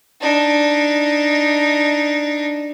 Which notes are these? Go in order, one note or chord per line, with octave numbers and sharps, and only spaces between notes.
D4 D#4